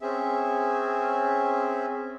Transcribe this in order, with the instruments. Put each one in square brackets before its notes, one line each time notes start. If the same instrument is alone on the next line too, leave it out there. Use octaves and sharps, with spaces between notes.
[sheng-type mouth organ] C4 C#4 G#4 E5